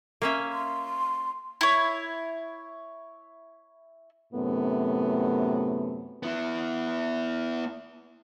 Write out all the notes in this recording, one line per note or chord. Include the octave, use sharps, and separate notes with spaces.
A#3 C#4 E5
C6
E4 C#5
F#2 A2 C3 A3 B3
B3 E4